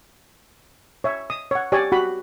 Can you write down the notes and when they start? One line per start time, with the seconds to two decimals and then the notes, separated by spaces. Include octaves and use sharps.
1.04 C#5 E5
1.30 D#6
1.51 C#5 F#5
1.72 G4 C#5 D5 G#5
1.92 F#4 G4 F#5 B5